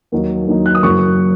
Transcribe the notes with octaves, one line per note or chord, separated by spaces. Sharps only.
D#2 D#3 F#3 D#4
D#2 D#3 F#3 D#4
F#6
D#6
F#1 F#2 F#3 C#6